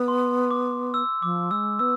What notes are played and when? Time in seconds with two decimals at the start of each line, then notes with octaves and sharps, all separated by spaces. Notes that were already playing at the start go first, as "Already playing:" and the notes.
Already playing: B3
0.08 C6
0.51 D6
0.94 E6
1.22 F3 D6
1.51 G#3 E6
1.79 B3 E6